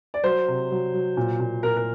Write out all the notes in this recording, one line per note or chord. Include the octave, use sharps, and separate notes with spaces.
D5
F#3 C5
C3
F#3
F#3
A#2
A#2
A#2 A#4
A#4